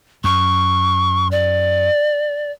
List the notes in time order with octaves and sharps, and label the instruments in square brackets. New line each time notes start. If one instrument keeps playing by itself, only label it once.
[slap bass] F#2 [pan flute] C#6
[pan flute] D5